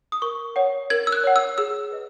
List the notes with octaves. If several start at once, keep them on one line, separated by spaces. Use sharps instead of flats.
D#6
A#4 C#6
C#5 F#5
A#4 G#6
E6
F#6
C#5 F#5
E6
G#4 E6
B4 D#5